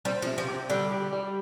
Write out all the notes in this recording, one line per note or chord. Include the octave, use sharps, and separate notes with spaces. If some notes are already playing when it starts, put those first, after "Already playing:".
G3 C4
F3
C3
F3
G4
D3 G3
G4
G3